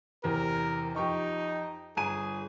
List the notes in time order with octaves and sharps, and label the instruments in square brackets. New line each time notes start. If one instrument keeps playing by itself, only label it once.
[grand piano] E2 C3 [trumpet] A#4
[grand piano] F2 G4 C#6 [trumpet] D#4
[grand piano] G1 G#5 D#7 [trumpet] G#4